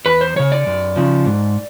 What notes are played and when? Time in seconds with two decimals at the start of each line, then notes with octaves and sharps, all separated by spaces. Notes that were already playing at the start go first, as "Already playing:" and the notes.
0.06 E2 B4
0.21 C5
0.36 C#3 F3 C#5
0.52 D5
0.66 F#2
0.96 C#3 F3
1.26 G#2